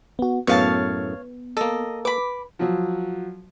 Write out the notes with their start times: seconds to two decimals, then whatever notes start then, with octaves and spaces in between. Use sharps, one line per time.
0.19 B3 F#4
0.47 F#2 A2 B3 C#5 F5 A5
1.57 A#3 A4 D#5
2.05 B4 B5 D6
2.59 F3 F#3